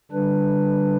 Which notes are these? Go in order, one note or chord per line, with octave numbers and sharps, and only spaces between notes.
D3 G3 D4 B4